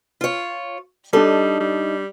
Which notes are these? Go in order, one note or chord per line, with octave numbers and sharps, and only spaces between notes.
F4 C#5
G3 D4 D#4 A4
G3